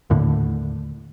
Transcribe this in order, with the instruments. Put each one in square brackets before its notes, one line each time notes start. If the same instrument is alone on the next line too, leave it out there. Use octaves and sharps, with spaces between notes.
[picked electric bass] D#2 A2 D3